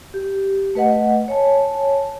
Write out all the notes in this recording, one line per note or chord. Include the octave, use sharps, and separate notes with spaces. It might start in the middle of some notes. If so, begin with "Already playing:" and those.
G4
A3 B4 D#5 F#5
C#5 G#5 A5